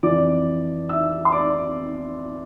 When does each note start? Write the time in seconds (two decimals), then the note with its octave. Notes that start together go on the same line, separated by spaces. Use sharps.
0.03 F2 E3 D5 D6
0.89 E5 E6
1.25 C6
1.32 D5 D6